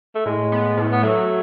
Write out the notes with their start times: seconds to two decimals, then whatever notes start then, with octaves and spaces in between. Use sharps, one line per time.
0.15 A3
0.26 A2 G#3
0.52 B3
0.77 A2
0.92 B3
1.03 F#3 A3